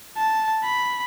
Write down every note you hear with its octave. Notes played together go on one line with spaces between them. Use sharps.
A5
B5